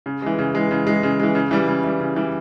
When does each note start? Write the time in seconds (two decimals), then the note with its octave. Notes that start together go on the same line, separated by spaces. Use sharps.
0.06 C#3
0.22 E3 G#3
0.39 C#3
0.55 E3 G#3
0.71 C#3
0.87 E3 G#3
1.03 C#3
1.20 E3 G#3
1.35 C#3
1.51 E3 G3
1.68 C#3
1.84 E3 G3
2.00 C#3
2.16 E3 G3